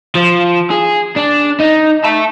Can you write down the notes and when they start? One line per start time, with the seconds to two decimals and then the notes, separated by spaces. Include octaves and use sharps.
0.15 F3
0.70 G#4
1.16 D4
1.60 D#4
2.05 E5 A5